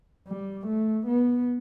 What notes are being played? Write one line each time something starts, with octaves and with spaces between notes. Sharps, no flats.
G3
A3
B3